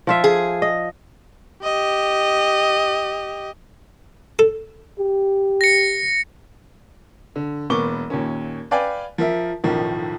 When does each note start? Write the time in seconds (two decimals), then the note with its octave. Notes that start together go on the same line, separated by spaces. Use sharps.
0.07 F3 F4 E5
0.24 G#4
0.62 D#5
1.63 G4 D#5
4.39 A4
4.99 G4
5.61 A#6 C#7
7.36 D3
7.70 E1 A#3 B3 C#6 D6 G7
8.10 D#2 A#2 C#4
8.71 B4 D5 F5 G5 G#5
9.18 F3 A#4 E5
9.64 B1 F#2 A2 D#3 F3